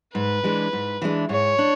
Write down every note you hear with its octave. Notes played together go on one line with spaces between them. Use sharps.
G#2 B4
E3 G#3 D4
G#2
E3 G#3 D4
G#2 C#5
D4